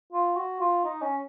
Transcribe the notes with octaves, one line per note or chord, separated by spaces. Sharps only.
F4
F#4
F4
D#4
C#4